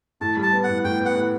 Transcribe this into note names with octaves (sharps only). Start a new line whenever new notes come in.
A2 A5
G3
A5
B3
F#5
A2
A2 G5
B3
F#5
A2